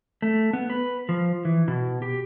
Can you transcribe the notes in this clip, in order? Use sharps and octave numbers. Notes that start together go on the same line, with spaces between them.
A3
B3
B4
F3
E3
B2
G4